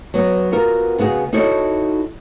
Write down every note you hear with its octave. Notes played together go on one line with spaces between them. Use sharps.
F#3 B3
B3 F4 F#4 A#4
C#3 B3 F#4 G#4
D#4 E4 F#4 A4 C#5